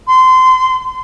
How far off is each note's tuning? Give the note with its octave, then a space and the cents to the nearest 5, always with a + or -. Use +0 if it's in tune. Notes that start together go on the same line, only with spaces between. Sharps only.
C6 -25